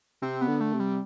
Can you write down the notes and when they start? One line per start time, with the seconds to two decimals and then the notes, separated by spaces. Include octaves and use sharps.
0.22 C3 C4
0.41 B3
0.47 D3
0.60 A3
0.73 C3
0.80 G3